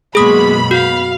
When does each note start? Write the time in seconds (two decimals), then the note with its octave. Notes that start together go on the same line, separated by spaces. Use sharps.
0.15 F#2 B2 G#3 A#3 G#4 B5 D#6
0.71 F#4 F5